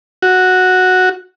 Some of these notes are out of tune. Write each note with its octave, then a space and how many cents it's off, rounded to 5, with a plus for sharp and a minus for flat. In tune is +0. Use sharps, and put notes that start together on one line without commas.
F#4 -5